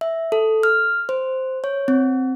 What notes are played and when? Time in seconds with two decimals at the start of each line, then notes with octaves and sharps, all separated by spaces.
0.01 E5
0.32 A4
0.63 F6
1.09 C5
1.64 C#5
1.88 C4